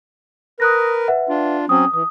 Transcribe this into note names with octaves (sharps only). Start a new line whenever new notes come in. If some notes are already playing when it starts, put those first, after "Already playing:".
A#4 B4 D#6 F#6 A#6
B4 E5 F#5
D4 F4
F#3 C4 C#4 D#6
E3 D#6